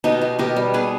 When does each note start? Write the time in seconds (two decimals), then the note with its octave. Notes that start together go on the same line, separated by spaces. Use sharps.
0.04 B2 D#4 G4
0.21 B2
0.39 B2 G4 A#4
0.56 G3
0.74 B2 G#4 B4